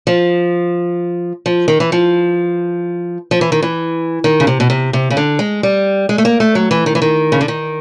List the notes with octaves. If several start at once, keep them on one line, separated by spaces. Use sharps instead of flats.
F3
F3
D#3
E3
F3
F3
E3
D#3
E3
D#3
C#3
C3
B2
C3
C3
C#3
D3
G#3
G3
G#3
A3
A#3
A3
F#3
E3
D#3
E3
D#3
C#3
D3
D#3